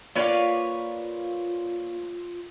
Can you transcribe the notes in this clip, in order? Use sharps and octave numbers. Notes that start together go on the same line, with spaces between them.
A#3 F4 B4 C#5 D5 F5